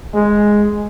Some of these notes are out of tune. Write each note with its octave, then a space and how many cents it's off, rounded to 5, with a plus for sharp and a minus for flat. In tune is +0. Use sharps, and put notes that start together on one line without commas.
G#3 +0